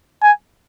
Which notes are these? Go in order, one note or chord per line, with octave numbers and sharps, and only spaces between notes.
G#5